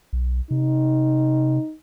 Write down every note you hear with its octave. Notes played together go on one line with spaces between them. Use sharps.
B1
C3 D#4